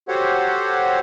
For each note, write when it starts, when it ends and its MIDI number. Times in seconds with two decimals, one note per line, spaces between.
0.09 1.00 66
0.09 1.00 67
0.09 1.00 69
0.09 1.00 72
0.09 1.00 73
0.09 1.00 78